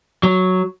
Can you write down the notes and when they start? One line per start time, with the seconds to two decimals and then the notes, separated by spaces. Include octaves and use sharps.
0.23 F#3